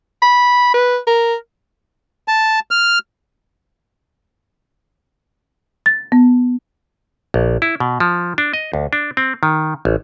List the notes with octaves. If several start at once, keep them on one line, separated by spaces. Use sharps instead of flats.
B5
B4
A#4
A5
F6
A6
B3
A#1
E4
B2
F3
D4
D#5
D2
D4
C4
D#3
A1